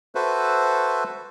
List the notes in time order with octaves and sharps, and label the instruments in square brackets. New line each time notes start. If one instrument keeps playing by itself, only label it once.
[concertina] F#4 A4 B4 C5 E5